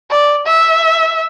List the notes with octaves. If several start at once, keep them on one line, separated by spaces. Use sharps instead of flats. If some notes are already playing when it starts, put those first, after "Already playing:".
D5
E5